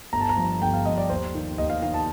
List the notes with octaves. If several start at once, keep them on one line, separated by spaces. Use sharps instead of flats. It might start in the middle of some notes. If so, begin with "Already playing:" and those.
G1 A#5
A5
A#5
G2 F3
G1 G5
F5
G2 F3 D#5
D5
D#2 C5
D#3
D#2 D#5
F5
D#3 F5
A5